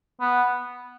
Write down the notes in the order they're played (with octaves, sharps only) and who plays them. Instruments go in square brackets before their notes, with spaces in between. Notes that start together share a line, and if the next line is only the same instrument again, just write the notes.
[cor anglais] B3